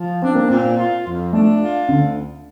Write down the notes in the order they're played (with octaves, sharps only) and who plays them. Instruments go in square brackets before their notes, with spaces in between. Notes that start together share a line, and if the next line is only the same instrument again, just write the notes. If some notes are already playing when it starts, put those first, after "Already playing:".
Already playing: [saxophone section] F3
[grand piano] C4 [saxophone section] D4
[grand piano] A#3
[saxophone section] A#2 [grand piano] C4
[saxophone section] F4
F2
[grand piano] A3 [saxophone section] D4
[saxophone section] F4
[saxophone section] D2 [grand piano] D3